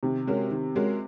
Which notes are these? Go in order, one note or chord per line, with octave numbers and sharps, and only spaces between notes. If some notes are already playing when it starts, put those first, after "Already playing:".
C3 D#3
G#3 C#4 F#4 A#4
D#3
G#3 C#4 F#4 A#4